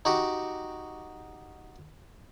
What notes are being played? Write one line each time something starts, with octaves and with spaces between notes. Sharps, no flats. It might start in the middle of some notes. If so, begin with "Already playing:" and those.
D#4 F#4 G4